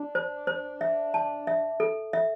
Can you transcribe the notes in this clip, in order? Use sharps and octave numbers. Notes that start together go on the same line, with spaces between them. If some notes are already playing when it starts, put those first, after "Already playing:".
Already playing: D4
C5
C5
E5
A5
E5
A4
E5